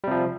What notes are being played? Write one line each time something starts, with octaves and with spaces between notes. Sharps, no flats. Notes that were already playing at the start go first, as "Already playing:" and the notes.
C3 F3 G3